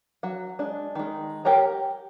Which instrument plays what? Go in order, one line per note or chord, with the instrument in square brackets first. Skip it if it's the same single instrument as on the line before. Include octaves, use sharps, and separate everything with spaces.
[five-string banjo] F#3 F#5
G#3 D4
D#3 G#3
G4 A#4 C#5 F#5 A#5